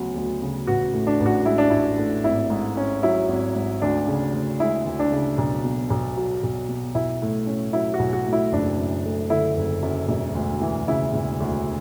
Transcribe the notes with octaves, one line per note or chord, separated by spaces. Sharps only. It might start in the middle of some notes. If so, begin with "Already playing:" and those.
Already playing: D2 C#3 F#3 B3
D2
C#3
A1 F#4
A2
D4
A1
F#4
G#3 E4
D4
A1 E4
A2
G#1 E4
G#2
C#4
F#3 E4
G#1
G#2
D2 D4
C#3
D2
G#3 E4
D2
D4
C#3
B1
B2
B1
F#3
B1
B2
B1 E4
A2
C#4
F#3 E4
F#4
B1
F#4
A2
E4
F#1 D4
F#2
A3
D3 E4
F#1
F#2
E1
D2
E3
C#3 E4
E1
D2